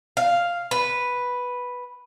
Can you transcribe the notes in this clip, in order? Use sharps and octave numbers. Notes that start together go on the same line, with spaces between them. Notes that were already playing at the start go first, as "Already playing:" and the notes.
F5
B4